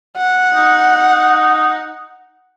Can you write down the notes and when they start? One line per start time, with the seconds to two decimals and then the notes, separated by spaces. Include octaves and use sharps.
0.17 F#5
0.54 D#4